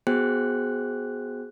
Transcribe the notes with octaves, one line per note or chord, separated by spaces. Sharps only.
B3 F#4 G#4 C5 G5 F#6